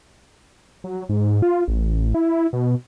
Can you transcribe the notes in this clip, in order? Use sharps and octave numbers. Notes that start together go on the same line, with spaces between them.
F#3
G#2
F4
A1
E4
B2